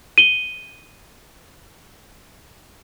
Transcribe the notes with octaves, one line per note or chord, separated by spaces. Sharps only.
D#7 G7